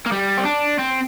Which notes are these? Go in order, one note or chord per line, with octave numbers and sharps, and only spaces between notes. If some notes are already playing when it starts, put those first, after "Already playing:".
A#3
G3
C4
D4
C4